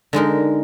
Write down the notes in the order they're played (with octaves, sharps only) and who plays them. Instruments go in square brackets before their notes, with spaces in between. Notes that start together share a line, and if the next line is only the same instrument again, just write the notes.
[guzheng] D3 G#3 D#4 A#4